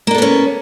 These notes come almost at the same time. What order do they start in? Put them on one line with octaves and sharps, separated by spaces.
A#3 D4 A4 B3 C#4